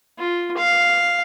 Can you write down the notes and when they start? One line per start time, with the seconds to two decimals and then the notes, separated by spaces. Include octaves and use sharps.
0.18 F4
0.57 F5